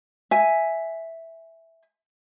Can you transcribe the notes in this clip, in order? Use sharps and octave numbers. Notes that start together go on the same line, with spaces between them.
E5 G#5